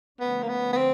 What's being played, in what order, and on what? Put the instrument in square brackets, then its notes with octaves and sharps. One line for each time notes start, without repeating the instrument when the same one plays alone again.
[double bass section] D3 F3 A3 C#4 [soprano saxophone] B3
[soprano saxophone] A#3
B3
B3
C4